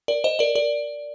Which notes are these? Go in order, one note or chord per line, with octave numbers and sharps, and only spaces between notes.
A#4 D5
C5 D#5
A#4 D5
A#4 D5